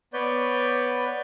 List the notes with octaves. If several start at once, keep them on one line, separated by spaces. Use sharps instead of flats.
B3 B4 C#5 D5 G6